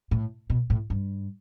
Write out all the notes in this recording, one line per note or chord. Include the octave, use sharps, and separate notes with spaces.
A2
B2
A2
G2